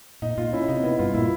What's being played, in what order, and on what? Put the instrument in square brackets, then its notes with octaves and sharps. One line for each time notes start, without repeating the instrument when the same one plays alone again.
[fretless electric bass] A#2 [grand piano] D#4
[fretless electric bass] A#2 [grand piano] F4
[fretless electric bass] C#4 [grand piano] E4
[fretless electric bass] C3 [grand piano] D#4
[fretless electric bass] B3 [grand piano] E4
[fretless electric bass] G2 [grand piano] F4
[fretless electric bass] A#2 [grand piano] E4